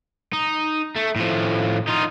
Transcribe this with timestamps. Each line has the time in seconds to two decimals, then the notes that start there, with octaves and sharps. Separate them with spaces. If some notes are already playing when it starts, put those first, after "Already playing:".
0.33 D#4
0.96 A3
1.16 A2 F3
1.87 D#4 F4